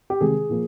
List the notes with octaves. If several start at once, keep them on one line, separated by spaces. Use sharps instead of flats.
G4
C3 D#3 G#3 G#4
A#2 F3 A#3